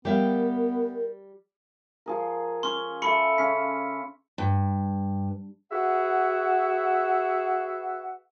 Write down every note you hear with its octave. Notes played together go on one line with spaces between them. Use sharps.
G3 B3 G4 A#4 E5 F5
F3 G#4 A#4
C#4 C6 C#6
A4 E5 B5 C#6 C#7
C#3 C#4 B6
G2
F#4 G#4 B4 E5 F#5